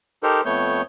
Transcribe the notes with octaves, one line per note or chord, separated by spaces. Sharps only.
D#4 G4 A4 A#4 C5
F2 A3 B3 C#5 G6